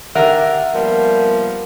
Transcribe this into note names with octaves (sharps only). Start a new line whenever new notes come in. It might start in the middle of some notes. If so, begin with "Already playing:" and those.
D3 G4 A#4 E5
F3 G3 A#3 B3 A#4